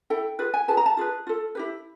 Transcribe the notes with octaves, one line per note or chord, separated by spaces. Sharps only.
E4 A4 G5
F4 G#4 B4
G#5
F4 G#4 B4 A5
A#5
A5
F4 G#4 B4
F4 A4
E4 G4 B4